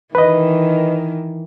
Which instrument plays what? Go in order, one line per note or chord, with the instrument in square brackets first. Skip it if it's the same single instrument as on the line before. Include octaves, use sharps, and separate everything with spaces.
[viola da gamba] D#3 E3 [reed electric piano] B4 D#5